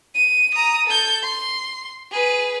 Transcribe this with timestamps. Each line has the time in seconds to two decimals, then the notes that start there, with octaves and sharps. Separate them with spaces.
0.15 D#7
0.55 A#5 D#6
0.87 A4 G6
1.23 C6
2.12 G#4 B4